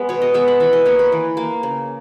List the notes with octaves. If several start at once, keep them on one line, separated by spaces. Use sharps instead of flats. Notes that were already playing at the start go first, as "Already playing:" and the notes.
Already playing: G#3 B3 B4
B2 C#5
D#5
G#3 B3 E5
F#5
E3 E5
D#5
A#3 C#5
B4
E3
A#3
C#3